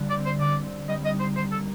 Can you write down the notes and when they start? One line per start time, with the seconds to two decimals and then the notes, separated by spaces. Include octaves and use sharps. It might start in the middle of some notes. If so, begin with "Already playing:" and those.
Already playing: D3 G3
0.10 D5
0.17 C4
0.26 C5
0.40 D3 D5
0.65 C4
0.88 G3 D#5
1.05 D#5
1.13 D#4
1.20 C5
1.36 D#3 C5
1.52 A4
1.59 A#3